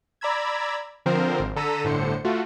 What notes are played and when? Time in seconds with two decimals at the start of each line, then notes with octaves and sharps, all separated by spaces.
0.21 D5 A#5 B5 E6 G#6
1.06 D3 F3 C4 A#4 C5
1.40 G#1
1.56 D3 A4 A#5 E6 B6 D#7
1.84 G1 A2 D3 C5 C#7
2.24 A3 F4 F#4